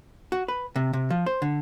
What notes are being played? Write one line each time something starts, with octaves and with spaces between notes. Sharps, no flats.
F#4
B4
C3
C3
F3
C5
D3